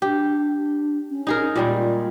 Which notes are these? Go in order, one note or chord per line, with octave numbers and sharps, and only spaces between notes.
D4 G4
C#4
D#4 G#4 A#4
A#2 G3 G#3 F4